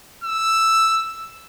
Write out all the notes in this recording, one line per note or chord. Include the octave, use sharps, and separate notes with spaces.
E6